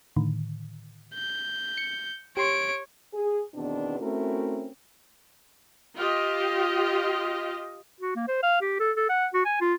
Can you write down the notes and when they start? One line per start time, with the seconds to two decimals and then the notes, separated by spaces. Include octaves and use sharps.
0.16 A2 D3 D#3
1.14 G6
1.77 C#7
2.37 G4 C#5 C6 D7
3.14 G#4
3.54 E2 B2 D#3 B3 C4 D4
4.00 A3 C4 C#4 E4 F#4 A#4
5.96 F4 G4 D#5
8.01 F#4
8.16 A#3
8.28 C5
8.43 F5
8.61 G4
8.80 A4
8.97 A4
9.09 F#5
9.34 F#4
9.45 G#5
9.61 F4